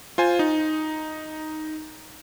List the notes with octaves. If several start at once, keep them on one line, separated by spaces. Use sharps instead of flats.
F4 C5 G#5
D#4